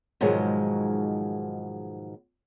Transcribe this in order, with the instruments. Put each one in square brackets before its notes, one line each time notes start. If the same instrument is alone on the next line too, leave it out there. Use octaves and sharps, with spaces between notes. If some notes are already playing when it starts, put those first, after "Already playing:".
[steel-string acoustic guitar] G#2 B2 D#3 F3 F#3 G#3